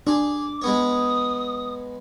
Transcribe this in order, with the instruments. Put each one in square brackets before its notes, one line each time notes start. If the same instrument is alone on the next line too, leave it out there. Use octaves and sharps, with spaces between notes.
[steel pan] D4 [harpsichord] G#4 [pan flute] D6
[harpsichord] G#3 B3 C#5 [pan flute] D#6